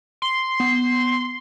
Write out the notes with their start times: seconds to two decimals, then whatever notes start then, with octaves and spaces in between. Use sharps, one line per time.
0.22 C6
0.60 B3